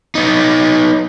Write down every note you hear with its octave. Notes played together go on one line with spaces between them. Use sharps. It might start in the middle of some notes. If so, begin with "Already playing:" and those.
B3 D#4